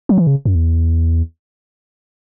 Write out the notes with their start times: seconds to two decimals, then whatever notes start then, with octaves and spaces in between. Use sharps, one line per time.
0.09 F#3
0.18 E3
0.27 C#3
0.45 F#2
0.55 E2